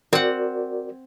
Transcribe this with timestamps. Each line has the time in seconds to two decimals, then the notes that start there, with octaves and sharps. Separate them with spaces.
0.13 C4 F#4 A#4 D5 F#5